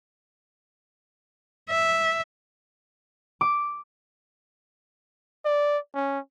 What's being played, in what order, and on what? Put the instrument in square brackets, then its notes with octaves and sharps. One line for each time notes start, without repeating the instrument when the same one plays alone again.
[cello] E5
[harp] D6
[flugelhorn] D5
C#4